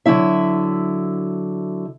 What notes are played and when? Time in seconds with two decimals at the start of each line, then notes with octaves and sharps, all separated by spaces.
0.06 D3 F#3 E4 E5